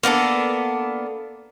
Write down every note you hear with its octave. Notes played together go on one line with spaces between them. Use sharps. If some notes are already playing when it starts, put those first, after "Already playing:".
A#3 B3 D4 A4